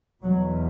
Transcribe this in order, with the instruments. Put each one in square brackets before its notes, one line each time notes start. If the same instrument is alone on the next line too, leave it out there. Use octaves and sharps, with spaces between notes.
[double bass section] E2 B2 F#3